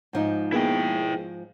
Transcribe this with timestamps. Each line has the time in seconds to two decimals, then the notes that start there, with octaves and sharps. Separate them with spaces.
0.13 G#2 F3 D#4
0.52 A#3 B3 E4 G#4 G5